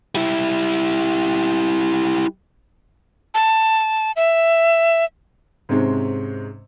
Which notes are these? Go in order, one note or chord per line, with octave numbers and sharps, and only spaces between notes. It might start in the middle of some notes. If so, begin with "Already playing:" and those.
G3 E4
A5
E5
G#2 C3 G#3 C4 C#4